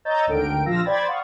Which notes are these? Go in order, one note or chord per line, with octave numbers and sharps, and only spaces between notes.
C#5 D#5 A#5 E6 G6 A6
G#1 D2 D3 A#4 G5 D7
A#1 F3 F5 E6 A#6
C5 D5 G5 B5 G#6 A6
F5 F#5 C#6 D#6